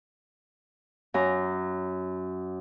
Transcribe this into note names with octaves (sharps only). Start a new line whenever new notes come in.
F#2 A#5